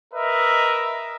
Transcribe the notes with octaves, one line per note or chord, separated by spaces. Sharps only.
A#4 B4 D#5 E5